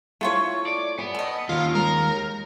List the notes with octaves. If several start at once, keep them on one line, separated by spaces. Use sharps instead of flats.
A3 E4 F4 A4 C#5 E5
D5
B3 G#5
A4 D#5
D#2 C#4 F4
G#3 A#4